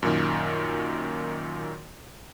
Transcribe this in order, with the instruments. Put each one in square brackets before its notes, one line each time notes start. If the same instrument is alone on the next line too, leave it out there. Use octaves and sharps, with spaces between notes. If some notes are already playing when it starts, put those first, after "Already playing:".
[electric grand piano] F#2 A#2 D#3